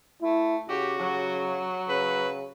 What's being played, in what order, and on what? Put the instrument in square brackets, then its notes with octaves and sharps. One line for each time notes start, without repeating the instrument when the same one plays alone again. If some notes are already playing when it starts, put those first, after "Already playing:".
[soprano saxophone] A3 [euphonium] E4
[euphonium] C#3 [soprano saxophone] F#4 [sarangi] G4
[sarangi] F#3
[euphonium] C#3 [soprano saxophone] B4